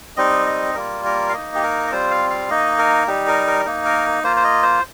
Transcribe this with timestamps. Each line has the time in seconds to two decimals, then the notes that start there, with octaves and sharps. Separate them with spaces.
0.17 G3 C4 D#4 D#5
0.46 D#5
0.75 G3 A#3 F4 A#4
1.05 A#4
1.29 F5
1.33 A#3 D#4 D#5
1.55 G4
1.63 A#4
1.87 D#5
1.91 G3 C4 F4 C5
2.11 F5
2.30 F5
2.50 A#3 D#4 D#5
2.79 A#4
3.07 G3 D#4 G4
3.27 A#4
3.47 A#4
3.65 A#3 D#4
3.85 A#4
4.24 A#3 F4 C5
4.36 C5
4.44 D#5
4.63 C5